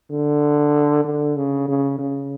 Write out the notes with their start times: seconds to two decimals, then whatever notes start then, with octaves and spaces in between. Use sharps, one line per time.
0.10 D3
1.05 D3
1.36 C#3
1.68 C#3
1.99 C#3